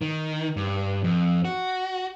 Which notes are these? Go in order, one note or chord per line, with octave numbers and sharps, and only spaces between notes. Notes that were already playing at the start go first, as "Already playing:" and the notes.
D#3
G2
F2
F#4